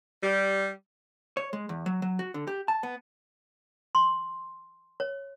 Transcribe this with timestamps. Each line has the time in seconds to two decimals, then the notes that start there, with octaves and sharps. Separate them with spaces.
0.23 G3
1.37 C#5
1.53 G#3
1.69 E2
1.86 F#3
2.02 F#3
2.19 F#4
2.34 D3
2.47 G4
2.68 A5
2.83 B3
3.95 C6
5.00 C#5